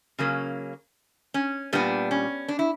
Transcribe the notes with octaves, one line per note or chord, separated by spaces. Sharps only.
C#3 F#3 A#3 C#4
C#4
A#2 G3 B3 D4
C#4
D4
E4